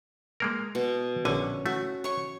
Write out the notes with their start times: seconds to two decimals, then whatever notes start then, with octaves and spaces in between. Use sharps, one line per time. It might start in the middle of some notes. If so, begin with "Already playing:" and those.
0.40 G#3 A#3 A#4
0.75 B2
1.25 A#1 D3 C#4 G#5
1.66 A3 F#4
2.04 C#5 C#6